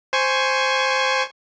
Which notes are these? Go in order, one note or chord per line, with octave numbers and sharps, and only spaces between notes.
C5 G#5 C#6